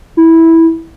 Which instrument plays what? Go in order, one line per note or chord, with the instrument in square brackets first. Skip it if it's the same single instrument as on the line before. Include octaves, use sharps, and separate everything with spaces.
[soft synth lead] E4